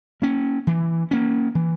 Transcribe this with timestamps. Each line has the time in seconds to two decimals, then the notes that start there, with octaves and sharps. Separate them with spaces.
0.22 A#3 C#4
0.67 E3
1.11 A#3 C#4
1.55 E3